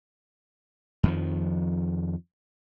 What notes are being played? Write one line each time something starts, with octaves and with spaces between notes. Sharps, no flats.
F2 D#3 F3